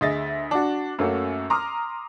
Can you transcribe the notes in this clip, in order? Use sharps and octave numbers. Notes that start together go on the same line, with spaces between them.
D2 G#4 D#5 E5 A6
D4 F#4
F#2 A3 A#3 C#4 F#4
A#5 C6 D6 D#6 F6